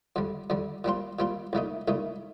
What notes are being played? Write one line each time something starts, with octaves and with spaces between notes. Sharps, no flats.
F2 D3 G3
F2 D3 G3
A#2 G3 C4 F4
A#2 G3 C4 F4
C2 A#2 A3 D#4
C2 A#2 A3 D#4